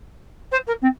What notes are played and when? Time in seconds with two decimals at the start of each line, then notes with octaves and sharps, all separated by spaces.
0.51 C5
0.67 A#4
0.81 C4